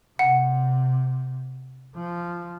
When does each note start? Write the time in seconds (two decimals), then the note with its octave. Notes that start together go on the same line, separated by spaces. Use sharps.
0.19 C3 F#5
1.96 F3